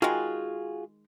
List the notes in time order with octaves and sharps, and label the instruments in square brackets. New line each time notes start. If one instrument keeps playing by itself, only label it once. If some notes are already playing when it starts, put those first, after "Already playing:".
[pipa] D#3 G#3 [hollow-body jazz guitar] F4 F#4 G#4